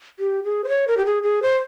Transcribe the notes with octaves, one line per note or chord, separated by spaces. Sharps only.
G4
G#4
C5
C#5
A#4
G4
G#4
G#4
C5